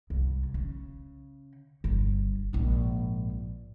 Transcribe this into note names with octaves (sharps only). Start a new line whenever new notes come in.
C2
C#3
G1
A#1 G#2